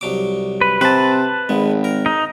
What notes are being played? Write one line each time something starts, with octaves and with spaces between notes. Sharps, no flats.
C2 F#3 D6
B4
C3 B4 C5 A5
G#1 G#3
A#4
D#4